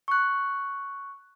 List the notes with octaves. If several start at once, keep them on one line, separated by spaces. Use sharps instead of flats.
C#6 F#6